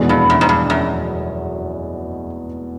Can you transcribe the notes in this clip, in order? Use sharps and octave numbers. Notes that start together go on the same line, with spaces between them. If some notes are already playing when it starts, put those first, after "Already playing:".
Already playing: F1 E2 B2 G#3 B3
G2
F#2
G#2
G2
F#2